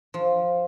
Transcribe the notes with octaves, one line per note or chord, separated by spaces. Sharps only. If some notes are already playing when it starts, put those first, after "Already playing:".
F3